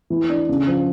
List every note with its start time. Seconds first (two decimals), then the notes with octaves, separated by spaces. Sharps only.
0.10 E3
0.30 D4
0.49 C#3
0.67 F3